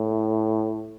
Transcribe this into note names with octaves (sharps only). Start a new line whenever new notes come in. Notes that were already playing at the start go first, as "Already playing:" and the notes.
Already playing: A2